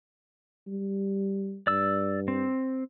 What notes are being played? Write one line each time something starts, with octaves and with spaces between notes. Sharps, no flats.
G3
G2 D5 E6
C4